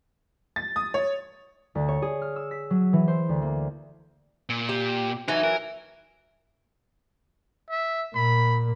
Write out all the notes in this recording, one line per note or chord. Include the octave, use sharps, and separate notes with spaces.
A6
D#6
C#5
D2
C#5
G#4
F6
E6
B6
F#3
E3
C5
D2
A#3
A#2
G4
E3 F#3 D#4
A#4
E5
A#2 B5